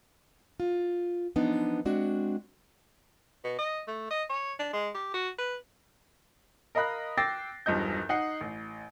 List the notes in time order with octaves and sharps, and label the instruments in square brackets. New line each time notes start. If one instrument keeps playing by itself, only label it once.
[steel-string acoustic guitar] F4
E3 F3 B3 D4 D#4
G#3 C4 D4 F#4
[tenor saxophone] B2
D#5
A3
D#5
C#5
D4
G#3
G4
F#4
B4
[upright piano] A#4 D#5 F5 B5 F#6
G5 D6 E6 A6 A#6 C7
E1 B1 G2 F3 D#5 G6
D#4 F#5 C7
A1